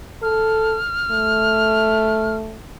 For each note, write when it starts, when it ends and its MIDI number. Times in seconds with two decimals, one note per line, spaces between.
0.23 0.77 69
0.23 2.36 89
1.11 2.59 57